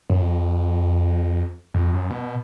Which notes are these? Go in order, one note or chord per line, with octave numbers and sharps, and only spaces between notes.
F#2
F2
F2
F#2
B2